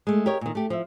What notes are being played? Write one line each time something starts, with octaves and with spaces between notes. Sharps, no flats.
G#3 A3
G4 A#4 C#5 D#5
A#2 D#3
A3 G4
F3 E5